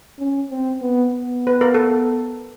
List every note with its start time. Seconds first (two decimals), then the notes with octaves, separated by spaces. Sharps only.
0.19 C#4
0.50 C4
0.82 B3
1.12 B3
1.47 B4
1.61 A#4
1.74 A4